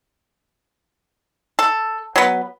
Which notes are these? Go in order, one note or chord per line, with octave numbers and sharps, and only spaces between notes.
A4
F#3 B3